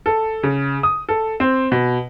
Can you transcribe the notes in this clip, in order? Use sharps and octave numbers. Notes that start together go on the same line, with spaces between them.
A4
C#3
D#6
A4
C4
B2